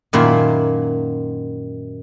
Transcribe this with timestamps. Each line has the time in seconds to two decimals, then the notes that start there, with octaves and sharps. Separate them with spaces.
0.13 F#2 A#2 D#3 E4